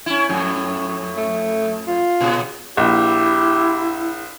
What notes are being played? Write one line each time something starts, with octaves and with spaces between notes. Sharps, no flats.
C#4 E4
F2 A2
A3
F4
A#2 C#3
A#1 E4 G4